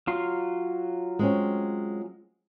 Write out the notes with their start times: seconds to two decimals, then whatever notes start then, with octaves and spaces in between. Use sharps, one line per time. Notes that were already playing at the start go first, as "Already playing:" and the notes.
0.07 F#3 F4 C6
1.19 G#3 C4 C#4